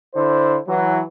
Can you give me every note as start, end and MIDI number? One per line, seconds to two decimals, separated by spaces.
0.15 0.57 50
0.15 0.57 64
0.15 0.57 72
0.67 1.02 52
0.67 1.02 54